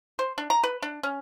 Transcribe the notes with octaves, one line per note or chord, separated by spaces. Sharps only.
C5
D4
A#5
B4
D4
C#4